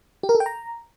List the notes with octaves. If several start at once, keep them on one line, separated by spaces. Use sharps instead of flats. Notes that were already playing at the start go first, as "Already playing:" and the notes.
G4
A#4
A4
G5
A#5